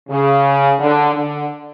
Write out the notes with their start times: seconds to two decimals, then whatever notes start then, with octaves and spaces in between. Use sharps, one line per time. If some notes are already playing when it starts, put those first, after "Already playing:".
0.10 C#3
0.80 D3
1.14 D3